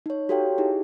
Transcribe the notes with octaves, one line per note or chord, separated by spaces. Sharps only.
D#4 C#5
F#4 G4 A4 C#5 F5 G5
D#4 E4 G4 G#4